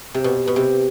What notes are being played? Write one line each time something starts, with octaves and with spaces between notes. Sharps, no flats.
C3
B2
B2
C3